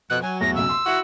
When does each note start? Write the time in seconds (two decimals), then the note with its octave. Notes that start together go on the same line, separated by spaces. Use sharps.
0.10 F2 B2 F#6
0.22 F#3 G#5
0.41 E2 A3 A#6
0.55 B1 C#3 E6
0.69 C6
0.86 E4 F#4